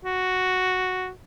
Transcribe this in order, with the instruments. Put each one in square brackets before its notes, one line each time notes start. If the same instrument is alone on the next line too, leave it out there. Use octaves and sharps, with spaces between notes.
[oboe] F#4